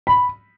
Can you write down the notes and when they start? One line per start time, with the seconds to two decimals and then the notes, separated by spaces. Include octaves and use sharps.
0.07 B5